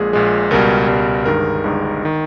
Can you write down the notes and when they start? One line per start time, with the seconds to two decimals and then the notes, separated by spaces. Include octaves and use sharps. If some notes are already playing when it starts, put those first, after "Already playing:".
Already playing: A#1 A#2 G#3 G#4
0.13 A#1 A#2 G#3
0.51 C#2 B2 G3 A#4
0.88 C#2 B2 G3
1.26 G1 G2 D#3 G#3 A#4
1.64 G1 G2 D#3 G#3
2.05 D#3